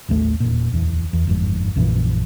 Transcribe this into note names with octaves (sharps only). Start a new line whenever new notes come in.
A1 D#2 A3
E1 A#2
D1 E2
E2
G1 F2 G#2
A#1 F#2 A#2 E3